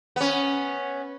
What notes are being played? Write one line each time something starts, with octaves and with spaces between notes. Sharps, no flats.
B3 C#4